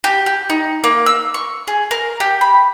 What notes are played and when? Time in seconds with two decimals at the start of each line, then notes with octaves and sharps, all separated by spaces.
0.04 G4
0.26 G4
0.50 D#4
0.84 A#3
1.06 E6
1.34 C#6
1.68 G#4
1.91 A#4
2.20 G4
2.41 B5